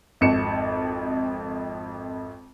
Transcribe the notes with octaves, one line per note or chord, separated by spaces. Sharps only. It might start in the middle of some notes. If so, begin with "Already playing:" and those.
G#1 F2 C#7 E7